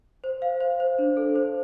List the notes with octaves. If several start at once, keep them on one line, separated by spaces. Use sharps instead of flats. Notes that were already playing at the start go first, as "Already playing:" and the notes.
C5
F5
C5
C5
D4
A4
C5